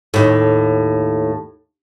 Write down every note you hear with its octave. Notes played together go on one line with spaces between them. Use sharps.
D#2 A2